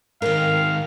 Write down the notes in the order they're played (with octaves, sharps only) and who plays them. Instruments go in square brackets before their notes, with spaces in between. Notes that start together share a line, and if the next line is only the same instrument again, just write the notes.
[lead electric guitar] G#2 D#3 [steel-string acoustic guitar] A#4 G5 [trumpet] F5